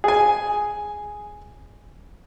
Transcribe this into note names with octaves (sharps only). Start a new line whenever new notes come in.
G#4 G#5